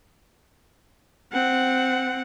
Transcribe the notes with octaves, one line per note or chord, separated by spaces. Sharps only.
C4 F#5